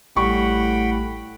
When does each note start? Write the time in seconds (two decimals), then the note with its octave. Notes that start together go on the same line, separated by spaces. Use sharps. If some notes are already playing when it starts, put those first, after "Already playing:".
0.16 A1 A2 G3 F#5 G5 B5 C#6